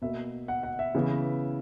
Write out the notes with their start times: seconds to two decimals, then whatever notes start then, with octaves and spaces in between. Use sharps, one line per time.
0.02 B2 A#3 E5
0.48 F#5
0.63 F#5
0.79 E5
0.95 C#3 E3 B3